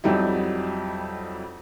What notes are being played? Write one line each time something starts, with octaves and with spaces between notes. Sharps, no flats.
F2 F#3 G3 D#4 E4